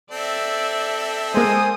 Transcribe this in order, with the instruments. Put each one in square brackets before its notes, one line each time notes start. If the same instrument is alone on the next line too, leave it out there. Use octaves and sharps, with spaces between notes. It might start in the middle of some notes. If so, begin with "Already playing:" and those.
[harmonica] C4 A4 [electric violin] D5 E5
[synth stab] G#3 A#3 [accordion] C5 G#5 [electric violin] D#6